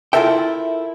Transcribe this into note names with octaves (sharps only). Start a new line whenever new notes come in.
E4 F4 A4 A#4 E5 G5